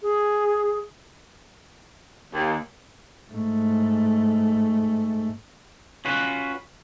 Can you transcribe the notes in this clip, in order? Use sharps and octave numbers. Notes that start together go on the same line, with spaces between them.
G#4
D#2
G#2 A3
C#4 F4 F#4 B4